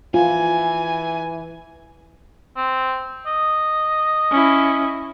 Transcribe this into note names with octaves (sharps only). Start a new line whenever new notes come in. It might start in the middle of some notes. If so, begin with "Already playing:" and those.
E3 F4 G#5
C4
D#5
C#4 E4